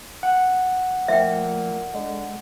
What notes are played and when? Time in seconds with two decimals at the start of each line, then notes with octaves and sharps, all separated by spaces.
0.23 F#5
1.08 A#2 F3 A3 E5 G5
1.94 D3 G#3